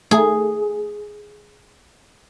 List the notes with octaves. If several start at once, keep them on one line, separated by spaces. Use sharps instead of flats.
A3 G#4